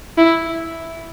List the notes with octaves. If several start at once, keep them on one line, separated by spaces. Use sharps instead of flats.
E4